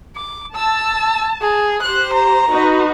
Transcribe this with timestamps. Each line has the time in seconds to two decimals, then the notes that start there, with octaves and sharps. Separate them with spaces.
0.16 D6
0.55 A5 E6
1.41 G#4
1.82 G4 C5 F#6
2.13 A#5
2.50 D#4 F#4 B4